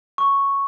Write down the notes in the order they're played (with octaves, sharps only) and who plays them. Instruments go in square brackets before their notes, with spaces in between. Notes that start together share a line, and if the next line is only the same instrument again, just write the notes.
[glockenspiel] C#6